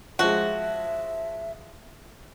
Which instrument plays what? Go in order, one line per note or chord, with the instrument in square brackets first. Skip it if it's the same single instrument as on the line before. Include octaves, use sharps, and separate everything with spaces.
[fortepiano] F3 G#3 [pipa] F#4 [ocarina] E5